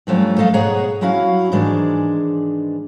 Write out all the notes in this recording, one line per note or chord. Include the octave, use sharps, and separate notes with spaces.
G2 F3 F#3 A3 C#4
A3 A4 D#5 F5
G#2 B2 G#4 C#5 F#5 A#5
F#3 C#4 E4 F#4 F5
G#2 D#3 E3 G#3 D4